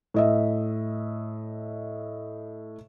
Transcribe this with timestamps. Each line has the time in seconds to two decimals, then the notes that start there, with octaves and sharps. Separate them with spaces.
0.14 A2 D#5 E5